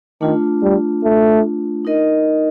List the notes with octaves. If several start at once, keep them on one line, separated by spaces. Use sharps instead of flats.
D#3 A3 D4 F4
G3
A3
D#4 A#4 D#5